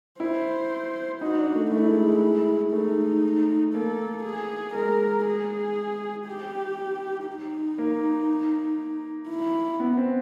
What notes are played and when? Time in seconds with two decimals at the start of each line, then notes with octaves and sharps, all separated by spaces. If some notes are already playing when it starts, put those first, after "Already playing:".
0.20 E4 C5
1.21 D#4 F#4
1.39 D4
1.55 A3
1.72 A3 E4
1.89 G#3
2.05 G#3
2.72 A3 D#4
3.74 A#3 A4
4.24 G#4
4.75 G#3 A#4
5.26 G#4
6.26 G4
7.27 D#4
7.78 A#3
9.29 E4
9.80 B3
9.97 C4